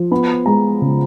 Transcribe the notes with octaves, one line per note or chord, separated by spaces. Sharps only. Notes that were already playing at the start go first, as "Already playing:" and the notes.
Already playing: F3
B3 B5
G#3 A#5
C#3